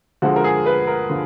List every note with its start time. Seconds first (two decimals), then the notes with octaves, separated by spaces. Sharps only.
0.22 D3 F3 G#3 F#4
0.36 A#4
0.44 G#4
0.66 B4
0.87 A#4
1.10 D3 F3